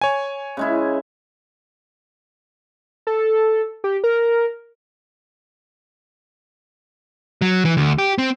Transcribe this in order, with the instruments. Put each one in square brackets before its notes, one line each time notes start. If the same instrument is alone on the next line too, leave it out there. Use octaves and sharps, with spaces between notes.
[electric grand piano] C#5 G#5
[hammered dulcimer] C#3 G#3 E4
[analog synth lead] A4
G4
A#4
[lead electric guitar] F#3
E3
D2
G4
C4